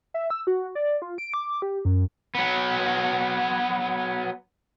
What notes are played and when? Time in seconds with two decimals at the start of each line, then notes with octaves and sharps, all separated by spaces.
0.14 E5
0.30 E6
0.47 F#4
0.75 D5
1.02 F4
1.18 D7
1.34 D6
1.62 G4
1.85 F#2
2.35 F#3 B3